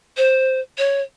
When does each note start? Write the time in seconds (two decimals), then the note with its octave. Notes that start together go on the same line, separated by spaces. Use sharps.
0.17 C5
0.78 C#5